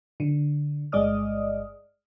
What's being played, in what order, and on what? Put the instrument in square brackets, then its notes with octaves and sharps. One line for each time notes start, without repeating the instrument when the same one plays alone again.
[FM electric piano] D3
G1 G#3 D5 D#5 D#6 F6